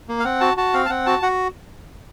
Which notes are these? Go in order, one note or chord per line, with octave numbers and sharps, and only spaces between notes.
A#3
F5
C4 F#5
F#4 A5
F#4 A5
C4 F5
A5
C4 F#5
F#4 A5
F#4 F#5